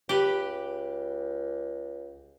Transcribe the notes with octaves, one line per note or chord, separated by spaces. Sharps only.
C#2 G4 B4